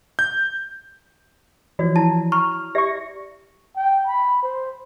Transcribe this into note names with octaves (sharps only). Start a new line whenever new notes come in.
G6
E3 F3 F#4 C#5 D5
E4 A5 A#5
A#5 C#6 F6
G4 D5 E5 C#6 A#6
G5
B5
C5